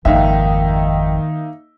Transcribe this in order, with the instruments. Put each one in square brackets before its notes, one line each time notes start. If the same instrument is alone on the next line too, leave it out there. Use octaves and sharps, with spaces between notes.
[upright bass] G#1 F2 [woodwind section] D#3 [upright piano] A#3 D#4 E5 [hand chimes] F5 G5